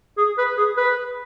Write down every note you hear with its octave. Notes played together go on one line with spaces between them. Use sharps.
G#4
B4
G#4
B4